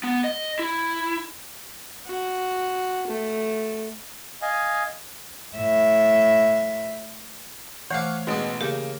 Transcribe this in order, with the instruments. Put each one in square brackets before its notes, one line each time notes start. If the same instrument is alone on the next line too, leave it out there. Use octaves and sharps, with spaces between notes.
[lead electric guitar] B3
D#5
E4
[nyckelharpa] F#4
A3
[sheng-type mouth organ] D#5 F5 G#5
[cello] A2 E5
[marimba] E3 A3 C5 [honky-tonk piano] C#5 F5 [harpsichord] F#5 D6
[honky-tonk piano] A1 G#3 [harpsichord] B2 D#4
[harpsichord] C#3 [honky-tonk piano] A#3 [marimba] G4 C#5 G6